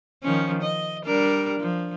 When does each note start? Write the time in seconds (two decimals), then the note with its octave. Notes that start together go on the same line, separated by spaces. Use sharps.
0.23 D#3 F3 C#4
0.62 D#5
1.05 G3 D4 A#4
1.60 F3